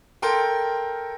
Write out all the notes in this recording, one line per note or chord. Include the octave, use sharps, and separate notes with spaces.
A4 A#4 G5 C6